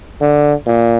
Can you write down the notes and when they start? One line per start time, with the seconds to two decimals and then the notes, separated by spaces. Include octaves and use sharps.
0.21 D3
0.67 A#2